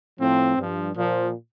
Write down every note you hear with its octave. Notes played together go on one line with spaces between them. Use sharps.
A2 F3 C4
G2 F3
A#2 F3